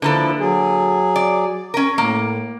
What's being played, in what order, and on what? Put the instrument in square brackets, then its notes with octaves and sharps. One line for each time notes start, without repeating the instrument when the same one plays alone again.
[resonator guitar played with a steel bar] D3 A#3 A4 [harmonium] F3 E4 B4
[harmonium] F#3 G#4
[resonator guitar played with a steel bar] D5
C#4 A#4
[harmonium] A2 [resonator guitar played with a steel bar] A#3